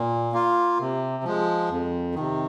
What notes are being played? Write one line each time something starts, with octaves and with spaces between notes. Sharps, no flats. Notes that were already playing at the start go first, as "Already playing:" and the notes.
Already playing: A#2
A#3 F4
C3
F3 G#3
F2
C3 D#3